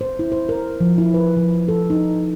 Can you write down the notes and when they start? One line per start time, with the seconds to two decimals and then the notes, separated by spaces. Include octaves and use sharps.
0.01 C5
0.19 E4
0.32 C5
0.49 A#4
0.81 F3
0.98 E4
1.14 B4
1.37 F3
1.68 A4
1.90 D#4